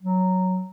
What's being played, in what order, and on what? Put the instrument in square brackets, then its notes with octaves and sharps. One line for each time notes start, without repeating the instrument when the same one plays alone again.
[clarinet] F#3